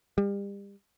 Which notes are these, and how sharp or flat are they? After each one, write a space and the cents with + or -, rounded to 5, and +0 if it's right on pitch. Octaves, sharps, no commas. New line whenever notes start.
G3 +35